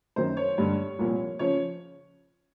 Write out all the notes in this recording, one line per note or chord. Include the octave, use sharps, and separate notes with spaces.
F#2 D#3 F#3 C5
C#5
G2 D3 G3
C2 A#2 F3
C#3 F3 C#5